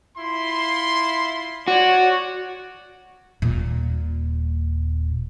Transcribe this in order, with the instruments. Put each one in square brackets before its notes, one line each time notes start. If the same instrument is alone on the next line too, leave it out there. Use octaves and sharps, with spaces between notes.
[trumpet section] E4 F4 C6
[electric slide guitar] F#4 [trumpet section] C#5 D5
[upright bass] D#1 A#2